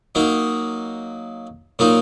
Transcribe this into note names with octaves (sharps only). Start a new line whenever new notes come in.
F#3 A#3 D#4
A#2 F#3 A#3 D#4